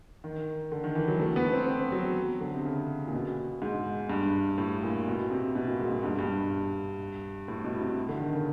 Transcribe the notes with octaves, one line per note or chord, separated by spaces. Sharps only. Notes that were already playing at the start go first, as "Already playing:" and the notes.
D#3
D3
D#3
E3
F#3
A3
B3
C4
C4
F#3
D3
C3
C#3
A#2
B2
G#2
G2
A2
A#2
B2
C3
B2
A#2
G#2
G#2
G2
G2
A2
B2
C3
D3
D#3
C#3